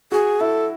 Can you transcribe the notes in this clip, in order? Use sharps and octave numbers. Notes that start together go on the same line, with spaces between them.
F#4 G#4
E4 A4